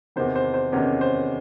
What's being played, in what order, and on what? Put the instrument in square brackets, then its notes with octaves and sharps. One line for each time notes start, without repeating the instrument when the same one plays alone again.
[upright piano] E2 C3 D#3 C5
C5
C5
E2 C3 D#3 C#4 C#5
C5